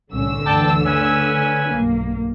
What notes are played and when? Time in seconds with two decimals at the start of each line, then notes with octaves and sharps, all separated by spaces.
0.12 C2 A2 D3 C#4 E6
0.46 D2 G2 E3 D5 G5 A5
0.86 A3 C#4 B4 G#5
1.69 B1 G2 A#3